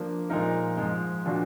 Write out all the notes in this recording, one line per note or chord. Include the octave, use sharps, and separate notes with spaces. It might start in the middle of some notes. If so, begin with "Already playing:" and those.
Already playing: F3 A#3 D4
A#2 F3 G#3 D#4 A#4
G#2 F3 G#3
A#2 F3 G#3 D4 F#4